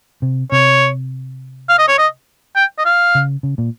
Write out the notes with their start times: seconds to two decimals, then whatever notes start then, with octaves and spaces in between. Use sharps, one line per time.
0.22 C3
0.52 C3 C#5
1.69 F5
1.78 D#5
1.88 C#5
1.98 D#5
2.56 G5
2.78 D#5
2.85 F5
3.15 C#3
3.43 C#3
3.58 A#2